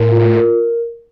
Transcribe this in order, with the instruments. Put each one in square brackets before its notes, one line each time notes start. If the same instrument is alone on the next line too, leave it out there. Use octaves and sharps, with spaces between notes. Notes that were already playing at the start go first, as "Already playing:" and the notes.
Already playing: [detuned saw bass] A2 [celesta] A#4
[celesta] F4
A#4